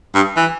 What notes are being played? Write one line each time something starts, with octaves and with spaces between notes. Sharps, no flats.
G2
E3